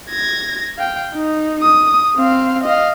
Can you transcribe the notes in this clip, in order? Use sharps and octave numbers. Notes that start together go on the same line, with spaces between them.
G#6 A#6
F5 G5
D#4
D#6
C4 F5
D#5 F5